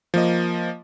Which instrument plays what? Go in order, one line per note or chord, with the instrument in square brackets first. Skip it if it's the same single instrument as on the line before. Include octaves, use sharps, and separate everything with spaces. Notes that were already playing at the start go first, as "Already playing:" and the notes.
[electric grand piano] F3 A#3 D#5